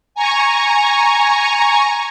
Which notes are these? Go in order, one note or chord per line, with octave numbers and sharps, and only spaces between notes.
G#5 A#5 C#6